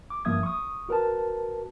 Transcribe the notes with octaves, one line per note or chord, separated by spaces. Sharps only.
D6
G2 F3 A#3 E5 D#6 G#6
C#6 D#6
F#4 A#4 B4 A5